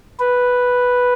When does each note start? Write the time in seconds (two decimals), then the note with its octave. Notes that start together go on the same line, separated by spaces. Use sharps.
0.19 B4